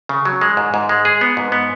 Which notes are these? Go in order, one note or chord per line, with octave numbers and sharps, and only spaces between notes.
C#3
F#3
G#3
G#2
G#2
G#3
G#4
B3
G#2
B3